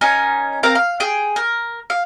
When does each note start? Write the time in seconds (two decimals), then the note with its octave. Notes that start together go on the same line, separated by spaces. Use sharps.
0.01 C#4 D#4 A#4 G#5
0.63 C4 A#4 F5 A#5
0.75 F5
1.00 G#4 G5
1.36 A#4
1.90 F5